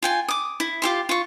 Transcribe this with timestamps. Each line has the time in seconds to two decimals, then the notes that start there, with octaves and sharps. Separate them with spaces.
0.02 F4 G5 G#5
0.28 D6 D#6
0.60 E4
0.82 F4 G4 C6
1.09 F4 C#6